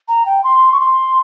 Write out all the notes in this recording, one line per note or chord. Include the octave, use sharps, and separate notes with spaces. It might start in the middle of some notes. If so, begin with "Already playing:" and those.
A#5
G5
C6
C#6
C6